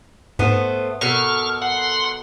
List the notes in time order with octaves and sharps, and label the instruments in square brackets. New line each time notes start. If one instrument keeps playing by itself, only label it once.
[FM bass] G#2 [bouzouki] A3 B3 C5
[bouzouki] B2 A4 A#4 [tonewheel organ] C#6 F6
[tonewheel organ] F#5 C6